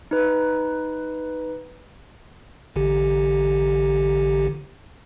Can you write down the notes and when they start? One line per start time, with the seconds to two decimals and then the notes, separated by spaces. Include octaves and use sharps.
0.11 D#4 B4
2.76 A1 D3 G4